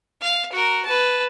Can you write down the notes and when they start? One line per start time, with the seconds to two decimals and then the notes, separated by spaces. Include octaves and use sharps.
0.22 F5
0.52 F#4 A#4
0.85 B4 A5